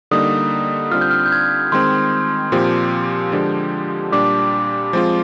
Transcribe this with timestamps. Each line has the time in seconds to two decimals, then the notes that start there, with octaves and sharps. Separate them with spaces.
0.11 D3 G3 A#3 D#4 D#6
0.91 D3 G3 C4 F4 F6
1.01 G6
1.10 F6
1.26 G6
1.32 F6 G#6
1.72 D#3 G#3 C4 C6
2.52 A#2 F3 C4 G4
3.32 D3 F3 G#3 D4 G4
4.12 A#2 G3 D4 G4 D6
4.93 F3 G#3 C4 F4